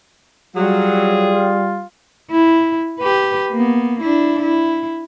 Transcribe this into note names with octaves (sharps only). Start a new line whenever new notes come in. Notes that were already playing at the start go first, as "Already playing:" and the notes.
F#3 G3 F4 G#4
E4
G4 B4
A#3 B3
D4 E4
E4